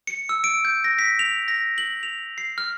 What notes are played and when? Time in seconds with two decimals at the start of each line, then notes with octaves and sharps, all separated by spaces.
0.07 C#7
0.29 E6
0.44 D7
0.65 G6
0.84 A#6
0.99 B6
1.19 F7
1.48 A#6
1.78 F#7
2.03 F7
2.38 C7
2.58 F6